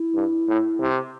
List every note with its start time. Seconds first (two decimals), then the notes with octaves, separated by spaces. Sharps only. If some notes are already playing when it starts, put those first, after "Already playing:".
Already playing: E4
0.15 G2
0.48 A2
0.80 C3